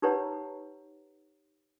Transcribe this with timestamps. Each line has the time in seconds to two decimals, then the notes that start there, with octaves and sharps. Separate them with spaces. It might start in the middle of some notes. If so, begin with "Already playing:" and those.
0.02 D#4 G4 B4 C#5 F#5 A#5